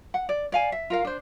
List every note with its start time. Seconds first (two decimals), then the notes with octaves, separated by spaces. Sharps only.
0.14 F#5
0.29 D5
0.52 D5 F5 G#5
0.72 E5
0.90 F4 A#4 F5
1.05 D4 C5